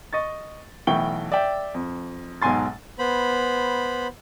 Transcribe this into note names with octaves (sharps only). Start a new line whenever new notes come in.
D#5 C#6 A6
B1 E3 A3 G5 C#6 G7
D5 E5 G5
F2
B1 G#2 B2 G#5 C6 A6
B3 C5 B5